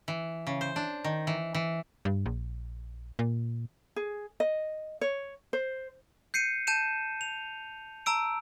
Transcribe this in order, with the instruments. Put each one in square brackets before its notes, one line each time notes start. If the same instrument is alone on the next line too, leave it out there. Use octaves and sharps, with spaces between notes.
[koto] E3
C#3
C5
D4
D#3
E3
E3
[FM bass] G2
A#1
A#2
[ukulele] G#4
D#5
C#5
C5
[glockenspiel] G6 C7 C#7 D#7
A5 G6 D#7 E7
F7
A5 A#5 E6 D7